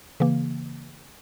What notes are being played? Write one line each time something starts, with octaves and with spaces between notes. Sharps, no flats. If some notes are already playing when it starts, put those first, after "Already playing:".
C#3 E3 A#3